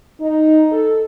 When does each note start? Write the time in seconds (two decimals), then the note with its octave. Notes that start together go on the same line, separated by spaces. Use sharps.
0.21 D#4
0.71 A4